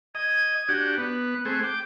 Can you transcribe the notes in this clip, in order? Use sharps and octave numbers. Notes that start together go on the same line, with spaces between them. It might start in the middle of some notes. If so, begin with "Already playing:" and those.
D#5 G#6
D4 F#4 G4
B3 F#6
A3 C4 G#4
G5 D6